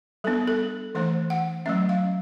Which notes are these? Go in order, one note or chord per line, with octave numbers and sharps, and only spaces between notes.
G3 B3 D4 A4
A4
E3 A3 D4 C5
F#5
F#3 A3 C#4 E5
F5